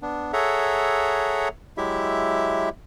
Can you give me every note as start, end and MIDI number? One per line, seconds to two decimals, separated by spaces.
0.02 0.32 59
0.02 0.32 62
0.33 1.48 68
0.33 1.48 69
0.33 1.48 73
0.33 1.48 76
0.33 1.48 78
0.33 1.48 82
1.77 2.69 54
1.77 2.69 56
1.77 2.69 64
1.77 2.69 67
1.77 2.69 76